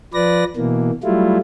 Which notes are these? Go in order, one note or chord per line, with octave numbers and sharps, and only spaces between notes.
F3 B4 D5 A#6
B2 E3 A#3
F#3 G3 A3 E4 F4